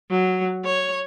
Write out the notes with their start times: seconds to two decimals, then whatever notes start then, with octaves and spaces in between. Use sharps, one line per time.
0.10 F#3
0.65 C#5